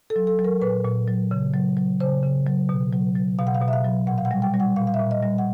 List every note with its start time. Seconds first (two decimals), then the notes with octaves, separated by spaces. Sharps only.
0.10 A4
0.16 F#3
0.27 A4
0.39 F#3
0.44 A#4
0.62 A#2 B4
0.85 A#2
1.08 F#3
1.31 C#3
1.54 F#3
1.77 F#3
2.00 C#3 C5
2.23 C#3
2.46 F#3
2.69 B2
2.93 F#3
3.16 F#3
3.38 B2 F5
3.47 F#5
3.55 F5
3.62 B2
3.68 E5
3.73 F5
3.85 F#3
4.07 A#2 F#5
4.18 F5
4.25 F#5
4.31 G3
4.42 G5
4.54 G3
4.60 F#5
4.76 A#2 F5
4.87 F5
4.94 E5
4.99 A#2
5.11 D#5
5.23 G3
5.38 F#5